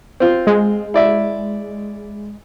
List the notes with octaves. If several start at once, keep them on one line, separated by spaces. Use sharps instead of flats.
C4 F4
G#3
E4 D5 E5